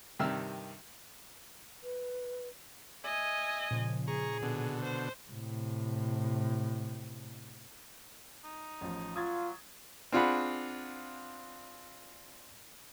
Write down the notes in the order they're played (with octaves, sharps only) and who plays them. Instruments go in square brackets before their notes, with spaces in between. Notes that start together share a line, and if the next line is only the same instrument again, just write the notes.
[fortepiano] G2 C3 D#3 G4 E6 F6
[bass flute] B4
[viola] D#5 G#5 [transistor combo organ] E5
[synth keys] A#2 C#3 F3
[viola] G#4 [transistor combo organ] A#5 C#6
[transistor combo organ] B2 D3
[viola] C5
[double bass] A2 C3
[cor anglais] D#4
[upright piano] A1 F3
[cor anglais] F#3 [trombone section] F4 [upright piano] D#6 G#6 A6
[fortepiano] C4 D4 F4 G#4 F#5 B5